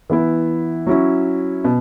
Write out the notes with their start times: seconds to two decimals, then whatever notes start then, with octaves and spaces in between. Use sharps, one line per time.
0.10 E3 B3 E4
0.87 F#3 C#4 E4
1.64 B2